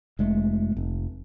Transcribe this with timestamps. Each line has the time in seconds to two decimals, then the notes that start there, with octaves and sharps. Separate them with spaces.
0.19 F1 G#3 A3
0.77 F1